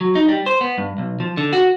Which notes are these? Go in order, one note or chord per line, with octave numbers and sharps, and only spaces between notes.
F#3
D#4
G3
C5
B3
G2
B1
F3
D3
F#4